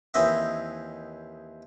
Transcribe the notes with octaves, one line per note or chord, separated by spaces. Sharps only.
D#2 E3 C4 D#5 E5